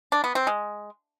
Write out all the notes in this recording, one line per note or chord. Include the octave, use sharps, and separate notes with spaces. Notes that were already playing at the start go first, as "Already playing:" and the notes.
D4
B3
C4
G#3